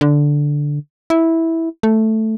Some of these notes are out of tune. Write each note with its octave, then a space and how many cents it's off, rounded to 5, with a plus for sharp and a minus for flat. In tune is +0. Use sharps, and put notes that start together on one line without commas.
D3 -5
E4 -10
A3 +0